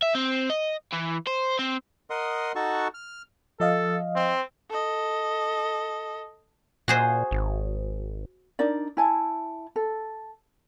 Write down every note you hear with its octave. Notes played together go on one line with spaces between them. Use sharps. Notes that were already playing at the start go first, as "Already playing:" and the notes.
E5
C4
D#5
E3
C5
C4
A#4 D#5 F#5 C6 D#6
D#4 F#4 A4 F#5 A5 C#6
F6
F3 A4 D#5 F5
C4
A4 D#5
A#2 F#4 G#4 C5
G#1
D4 D#4 A#4 D5
E4 G#5 A5
A4